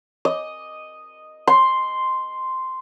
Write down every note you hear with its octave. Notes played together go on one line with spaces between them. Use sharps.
D#5
C6